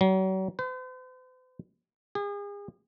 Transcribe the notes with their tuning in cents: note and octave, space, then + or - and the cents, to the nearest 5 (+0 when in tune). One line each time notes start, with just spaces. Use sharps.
F#3 +40
C5 -45
G#4 -40